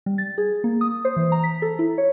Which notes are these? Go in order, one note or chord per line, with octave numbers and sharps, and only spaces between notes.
G3
A6
G#4
A#3
D#6
C5
E3
A#5
B6
A4
E4
C#5